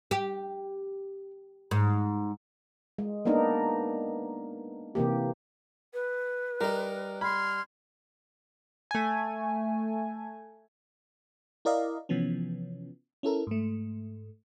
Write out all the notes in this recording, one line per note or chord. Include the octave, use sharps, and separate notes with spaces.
G4
G#2
G#3
A#3 B3 D4 D#4 A#4
C3 E3 A#3 G4
B4
G3 D#4 A#4
B5 C6 F6 G#6
A3 G#5
E4 A#4 D5 D#5 F5
C3 E3 F3 B3 C#4
C#4 E4 A4 A#4
G#2 A3